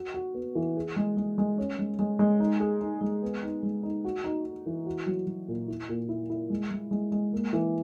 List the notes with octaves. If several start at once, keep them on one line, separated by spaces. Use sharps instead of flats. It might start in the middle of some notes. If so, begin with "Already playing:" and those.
Already playing: F#4
F#4
B3
E3
G#4
G#3
G#3
G#3
C#4
G#3
G#3
G#3
D#4
G#4
D#4
G#3
B3
D#4
G#3
D#4
F#4
D#4
D#4
E3
F#4
F#3
F#3
A#2
E4
A#2
E4
E4
G#3
G#3
G#3
G#3
A#3
E3